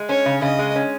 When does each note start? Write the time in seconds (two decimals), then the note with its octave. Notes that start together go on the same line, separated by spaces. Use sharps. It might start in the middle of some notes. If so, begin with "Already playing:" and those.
Already playing: G#3
0.09 C#4 C#5
0.26 C#3
0.42 C#3 D#5
0.59 G#3
0.76 C#4